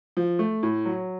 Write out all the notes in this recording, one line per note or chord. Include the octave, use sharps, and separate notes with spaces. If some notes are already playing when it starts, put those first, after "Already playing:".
F3
A3
A2
F#3